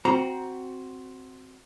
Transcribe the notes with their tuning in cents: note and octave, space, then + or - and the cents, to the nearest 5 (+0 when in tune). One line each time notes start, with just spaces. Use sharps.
C4 +0 F#4 +5 A#5 +10